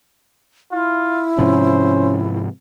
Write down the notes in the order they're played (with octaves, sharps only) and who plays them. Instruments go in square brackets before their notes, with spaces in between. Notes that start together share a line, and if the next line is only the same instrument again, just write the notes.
[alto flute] E4 [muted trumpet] F4
[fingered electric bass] G#2 C3 F3 [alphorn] C#4 [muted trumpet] C5